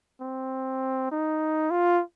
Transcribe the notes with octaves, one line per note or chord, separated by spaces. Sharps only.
C4
D#4
F4